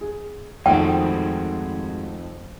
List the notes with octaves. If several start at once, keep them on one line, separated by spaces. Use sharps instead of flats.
G#4
F2 D#3 G#3 A3 C4 F#4 G5